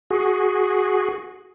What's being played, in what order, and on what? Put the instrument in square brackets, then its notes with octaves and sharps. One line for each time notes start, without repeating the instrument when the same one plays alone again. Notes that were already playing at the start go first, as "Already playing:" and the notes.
[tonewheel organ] F#4 G#4